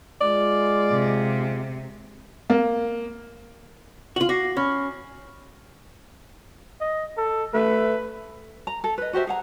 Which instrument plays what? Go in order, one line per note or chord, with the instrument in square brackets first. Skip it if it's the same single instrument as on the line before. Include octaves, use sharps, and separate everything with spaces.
[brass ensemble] G#3 F4 [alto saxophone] D5
[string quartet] C3
[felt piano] A#3
[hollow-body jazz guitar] F4 F#4 [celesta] F#7
[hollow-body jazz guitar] F#4 [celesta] D6 A#6 C7
[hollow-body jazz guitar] C#4 [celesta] B5 C#6 F6
[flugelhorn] D#5
A4
[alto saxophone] A3 [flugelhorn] B4
[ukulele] A#5
A4
B4 D#5
F#4 G4 C5 E5
G#4 F#5 A#5